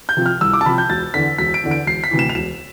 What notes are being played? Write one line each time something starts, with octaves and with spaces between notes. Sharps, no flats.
G6
C3 F3
F6
C2 E6
D6
A5
C3 F3 B5
G6
E1 A6
E2 D3 B6
E1 B6
D7
E2 D3
D7
E1 C7
B6
D2 C3 E3
E7
F7
E1 E7